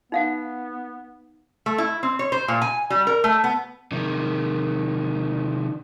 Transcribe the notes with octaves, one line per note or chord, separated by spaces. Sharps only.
B3 D#4 F5 F#5
A3
E4
C4
C#5
C5
A#2
G#5
G3
A#4
A3
B3
C3 D#3